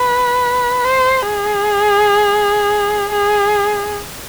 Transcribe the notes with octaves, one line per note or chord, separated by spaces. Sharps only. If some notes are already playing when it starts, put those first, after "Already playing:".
Already playing: B4
C5
G#4
G#4